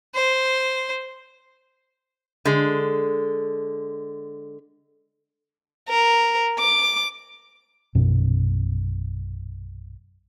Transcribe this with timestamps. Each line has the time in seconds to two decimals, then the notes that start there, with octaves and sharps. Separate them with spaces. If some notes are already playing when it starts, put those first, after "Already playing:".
0.14 C5
2.45 D3 G#3
5.89 A#4
6.59 D6
7.95 A#1 F#2 B2 C#4